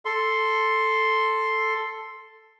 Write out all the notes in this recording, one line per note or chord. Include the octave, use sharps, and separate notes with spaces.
A4 C6